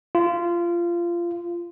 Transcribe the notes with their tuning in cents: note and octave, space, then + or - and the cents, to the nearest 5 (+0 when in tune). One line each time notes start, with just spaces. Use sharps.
F4 -20